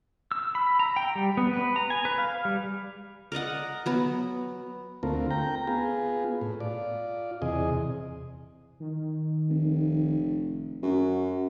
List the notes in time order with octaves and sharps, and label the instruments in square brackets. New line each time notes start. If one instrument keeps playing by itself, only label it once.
[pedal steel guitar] E6
B5
A#5
G5
G3
B3
B4
A#5
G#5
B4
F5
G3
[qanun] A#4 D5 D#5 F#5
F#3 B3
[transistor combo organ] D2 A3 C4 F4 A#4
G5 A#5
B3 F4 G#4
A2
F4 D5
E2 C3 G#4 D#5
[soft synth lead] D#3
[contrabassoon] F1
[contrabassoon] F#2 [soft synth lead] F#4